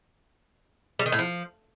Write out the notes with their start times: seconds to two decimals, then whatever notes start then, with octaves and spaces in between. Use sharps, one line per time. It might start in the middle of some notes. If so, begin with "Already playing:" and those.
0.99 G3
1.06 D#3
1.12 A2
1.19 F3